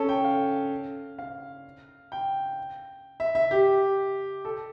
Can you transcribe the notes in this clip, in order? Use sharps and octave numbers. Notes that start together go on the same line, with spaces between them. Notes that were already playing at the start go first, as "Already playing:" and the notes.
Already playing: C#4 A4
G5
F5
F5
G5
E5
E5
G4
A4